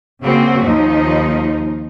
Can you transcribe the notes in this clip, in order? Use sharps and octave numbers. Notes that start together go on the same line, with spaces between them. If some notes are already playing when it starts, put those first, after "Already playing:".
C#3 A#3 C4 F#4
D#2 F3 D#4